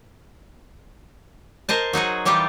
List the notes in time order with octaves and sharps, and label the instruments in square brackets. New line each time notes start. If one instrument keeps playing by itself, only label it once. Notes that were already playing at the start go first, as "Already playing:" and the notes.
[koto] A#4 C5 D#5 A5
F#3 D#4 F#4 G#4
E3 G3 D#4 F4 G4